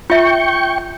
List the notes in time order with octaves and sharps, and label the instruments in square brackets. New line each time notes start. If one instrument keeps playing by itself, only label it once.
[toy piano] F4 E5 [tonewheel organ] G5 C#6